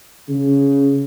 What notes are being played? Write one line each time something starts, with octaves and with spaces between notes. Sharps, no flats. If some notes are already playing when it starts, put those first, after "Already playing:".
C#3